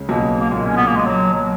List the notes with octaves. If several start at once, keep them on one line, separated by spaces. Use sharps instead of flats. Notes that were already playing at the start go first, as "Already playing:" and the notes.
Already playing: C#2 C#3
B1 B2 A#3
A#3
A#2 G#3
C#4
B3
A#3
G#3
F#3
F#3